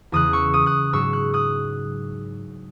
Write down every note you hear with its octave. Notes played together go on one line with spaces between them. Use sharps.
E2 C#3 E3 D#6 F#6
C#6 E6
D#6 F#6
D#6 F#6
G#2 F#3 C#6 E6
F#6
D#6 F#6